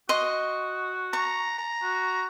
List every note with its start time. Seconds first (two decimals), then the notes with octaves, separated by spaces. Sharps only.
0.09 F#4 D#5 C6
1.13 A#5 C#6
1.58 A#5
1.82 F#4